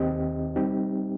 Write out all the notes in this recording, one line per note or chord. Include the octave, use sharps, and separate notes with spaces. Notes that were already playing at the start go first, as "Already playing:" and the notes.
Already playing: D#2 D#3 C4 G4 D#5
G3 C4 D#4 G4